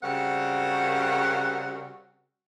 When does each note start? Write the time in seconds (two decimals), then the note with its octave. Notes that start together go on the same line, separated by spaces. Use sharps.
0.03 C#3 G3 C4 F#4 A#4 F#5